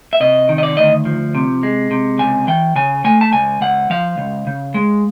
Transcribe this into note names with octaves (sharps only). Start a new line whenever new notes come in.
E5
C3 D#5
D#3
D#5
D5
D2 D#5
F3
C3
G#3
C3
C#2 G#5
E3 G5
C#3 G#5
A3 G#5
A5
C#2 G#5
C#2 F#5
F3 F5
C#2
C#3
G#3